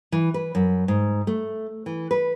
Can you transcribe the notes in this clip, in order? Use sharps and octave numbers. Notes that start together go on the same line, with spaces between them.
E3
B4
F#2
G#2
A3
E3
B4